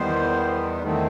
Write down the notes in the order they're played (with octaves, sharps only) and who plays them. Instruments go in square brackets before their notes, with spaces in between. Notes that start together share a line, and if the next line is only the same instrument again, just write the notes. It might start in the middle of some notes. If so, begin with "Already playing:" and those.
Already playing: [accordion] E2 D#3 G3 B3 C5
E2 D#3 A3 C4